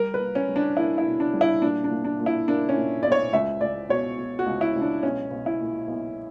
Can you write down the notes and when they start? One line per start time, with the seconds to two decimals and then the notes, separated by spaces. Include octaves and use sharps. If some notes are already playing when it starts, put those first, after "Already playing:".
Already playing: G3 A#4
0.14 B4
0.20 A#3
0.35 C#4
0.49 G3
0.56 D4
0.77 A#3 E4
0.98 E4
1.06 B2
1.20 D4
1.34 G3
1.41 E4
1.62 A#2 D4
1.84 D4
1.90 A#2
2.04 D4
2.20 A#2
2.26 E4
2.48 A#3 D4
2.69 C#4
2.76 A#2
3.03 B1 D5
3.12 C#5
3.33 C#2 E5
3.61 C#2 D5
3.89 B2 C#5
4.18 B2
4.39 F#4
4.46 C#2
4.61 E4
4.76 C#2
4.81 D4
5.03 B1 C#4
5.31 B1
5.46 E4
5.61 A#2
5.88 B1